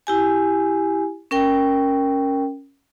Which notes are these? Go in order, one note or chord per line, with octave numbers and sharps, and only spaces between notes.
E4 G4 G#5
C#4 A#4 G5